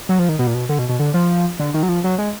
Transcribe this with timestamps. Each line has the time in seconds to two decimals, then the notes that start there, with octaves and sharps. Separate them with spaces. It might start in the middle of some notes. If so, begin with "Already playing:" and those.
0.09 F#3
0.19 F3
0.29 D#3
0.39 B2
0.47 A#2
0.54 B2
0.69 D3
0.79 B2
0.89 B2
0.99 D3
1.14 F3
1.59 D3
1.74 D#3
1.83 F#3
1.89 F3
2.04 F#3
2.18 G#3